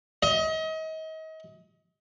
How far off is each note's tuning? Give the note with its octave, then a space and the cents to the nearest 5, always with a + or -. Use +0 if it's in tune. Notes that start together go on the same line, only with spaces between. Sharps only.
D#5 +35